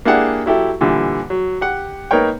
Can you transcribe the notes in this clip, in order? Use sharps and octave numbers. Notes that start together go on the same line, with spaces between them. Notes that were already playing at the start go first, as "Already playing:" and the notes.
A#3 D4 E4 G4 G#4 F#5
F#3 E4 G4 A4
A#2 D3 E3 G3
F#3
G4 F#5
A#3 D#4 A#4 B4 C#5 G5